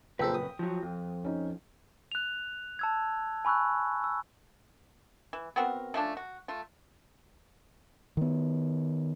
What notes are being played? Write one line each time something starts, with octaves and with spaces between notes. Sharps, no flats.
A#1 F#2 C#3 A4 B4 C5 G5
D#6
F3 F#3
F2
C#4 D#4
F#6 F7
A5 E6 G#6
G#5 B5 C#6 E6 F#6
E6
E3
B3 C4 F#4 A#4
F3 A3 C#4 D4
F#4
A3 F4
D#3 B3